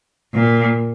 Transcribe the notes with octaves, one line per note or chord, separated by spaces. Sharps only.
A#2